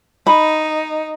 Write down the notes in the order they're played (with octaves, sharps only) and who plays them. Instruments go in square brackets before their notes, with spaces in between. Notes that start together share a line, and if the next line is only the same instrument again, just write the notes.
[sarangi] D#4 [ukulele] B5